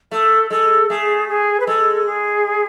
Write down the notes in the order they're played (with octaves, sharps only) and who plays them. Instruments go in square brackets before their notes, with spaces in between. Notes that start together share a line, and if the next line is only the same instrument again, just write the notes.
[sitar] A3 [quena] A4
[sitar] G#3 [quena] A4
[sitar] A3 [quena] G#4
[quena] G#4
B4
[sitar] G#3 [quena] A4
[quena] G#4